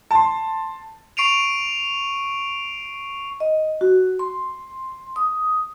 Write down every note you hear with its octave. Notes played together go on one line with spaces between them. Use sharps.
A5 C6
C#6 C7 D7 D#7 F7
D#5
F#4
C6
D#6